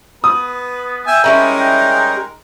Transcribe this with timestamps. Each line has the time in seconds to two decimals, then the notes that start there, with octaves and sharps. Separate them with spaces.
0.24 B3 B4 D#6
1.07 E5 G5 G#5 E6
1.24 G3 G#3 C#4 D#4 E4 A#4
1.60 G5